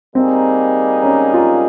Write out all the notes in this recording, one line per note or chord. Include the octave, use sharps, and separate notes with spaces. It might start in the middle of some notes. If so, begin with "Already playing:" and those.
G3 A#3 C4 D#4 G#4
C#4
F4